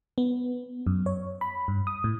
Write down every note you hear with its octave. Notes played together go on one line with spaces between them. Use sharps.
B3
F#2
C#5
B5
G2
D#6
A2